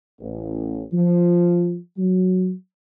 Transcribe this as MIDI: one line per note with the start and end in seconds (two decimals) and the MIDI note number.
0.20 0.83 33
0.93 1.78 53
1.97 2.52 54